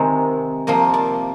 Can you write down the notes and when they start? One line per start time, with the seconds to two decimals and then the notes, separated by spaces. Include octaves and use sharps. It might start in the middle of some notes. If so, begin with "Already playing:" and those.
Already playing: C3 D#3 G#3
0.67 C3 F3 A#3 D#5
0.94 D5